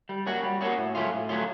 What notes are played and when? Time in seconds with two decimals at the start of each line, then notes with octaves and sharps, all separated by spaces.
0.09 G3
0.26 A#3 C#4 F#4
0.43 G3
0.61 A#3 C#4 F#4
0.78 A2
0.95 F#3 A3 C#4 F4
1.12 A2
1.29 F#3 A3 C#4 F4